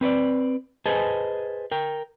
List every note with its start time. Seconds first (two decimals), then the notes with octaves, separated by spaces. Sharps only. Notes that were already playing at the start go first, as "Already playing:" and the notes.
0.01 C4 B4 C#5 D5
0.86 G#4 B4 C5 D#5 G#5 A5
1.71 A#4 G5